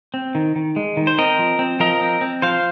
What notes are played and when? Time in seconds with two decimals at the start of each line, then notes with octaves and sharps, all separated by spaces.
0.14 C4
0.35 D#3
0.56 D#3
0.76 G#3
0.97 D#3
1.07 C5
1.18 C4 A#4 D#5
1.39 F3
1.59 C4
1.80 F3 A#4 D#5
2.01 C4
2.21 C4
2.42 F3 C5 F5